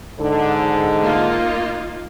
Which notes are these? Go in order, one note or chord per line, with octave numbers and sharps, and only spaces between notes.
G#2 D3
A#3 D#4 F4